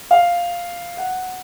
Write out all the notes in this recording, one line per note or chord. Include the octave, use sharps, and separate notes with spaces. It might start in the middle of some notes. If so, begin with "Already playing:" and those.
F5
F#5